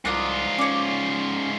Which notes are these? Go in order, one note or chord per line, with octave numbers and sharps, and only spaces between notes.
C2 G#2 D4 F4 A#4 D#6
C#4 C#5 D5